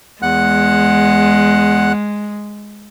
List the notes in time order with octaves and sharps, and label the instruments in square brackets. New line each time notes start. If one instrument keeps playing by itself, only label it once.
[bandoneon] E2 F#5 F#6 [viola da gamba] G#3